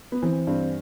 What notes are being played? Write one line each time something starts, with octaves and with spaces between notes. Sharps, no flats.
B3
E3 C4
G2 C4